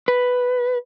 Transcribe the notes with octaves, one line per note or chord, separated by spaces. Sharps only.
B4